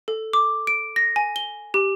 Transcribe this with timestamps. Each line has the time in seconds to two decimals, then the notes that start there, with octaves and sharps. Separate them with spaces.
0.08 A4
0.33 D6
0.67 D7
0.96 A#6
1.16 G#5
1.36 G7
1.74 G4